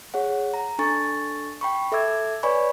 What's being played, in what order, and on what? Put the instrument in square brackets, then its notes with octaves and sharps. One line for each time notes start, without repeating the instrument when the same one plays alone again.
[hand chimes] G#4 C#5 F#5
A#5
D4 A4 G#5 C#6 A6
G5 B5 C#6
A4 E5 D6 E6 G#6
B4 C#5 D5 G#5 B5 C#6